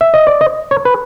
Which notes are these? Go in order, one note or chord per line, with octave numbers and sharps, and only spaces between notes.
E5
D#5
D5
D#5
C#5
B4